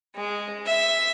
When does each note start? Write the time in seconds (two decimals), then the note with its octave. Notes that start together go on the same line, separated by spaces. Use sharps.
0.15 G#3
0.66 E5